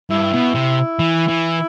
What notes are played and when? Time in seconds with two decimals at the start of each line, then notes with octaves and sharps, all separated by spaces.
0.10 G2 E4
0.32 B2
0.55 C3
0.99 E3
1.28 E3